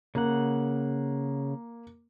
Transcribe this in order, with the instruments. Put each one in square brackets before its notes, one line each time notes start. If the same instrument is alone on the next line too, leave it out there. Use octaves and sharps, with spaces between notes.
[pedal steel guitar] C#3 F#5 [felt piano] A#3